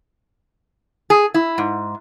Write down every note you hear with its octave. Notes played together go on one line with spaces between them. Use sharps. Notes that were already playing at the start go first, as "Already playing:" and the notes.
G#4
E4
G#2